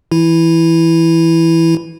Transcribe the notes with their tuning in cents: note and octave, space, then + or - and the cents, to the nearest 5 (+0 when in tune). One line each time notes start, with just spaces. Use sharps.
E3 +0 E4 +0